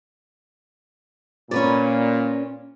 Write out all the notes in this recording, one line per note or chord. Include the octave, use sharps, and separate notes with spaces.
A#2 C#4 B4 D5